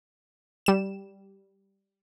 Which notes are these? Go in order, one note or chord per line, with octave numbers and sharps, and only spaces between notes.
G3 E7